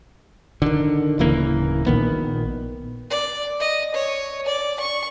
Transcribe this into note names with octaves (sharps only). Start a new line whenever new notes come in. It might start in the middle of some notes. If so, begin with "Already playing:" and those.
D3 D#3
D1 C#3 E3 A#3
A#1 A#2 D#3 B3
D5
D#5
C#5
D5
C#6